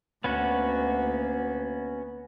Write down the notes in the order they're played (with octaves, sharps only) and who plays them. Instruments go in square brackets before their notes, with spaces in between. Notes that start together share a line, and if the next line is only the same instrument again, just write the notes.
[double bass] D2 A#3 [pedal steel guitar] B3 C#4 F#4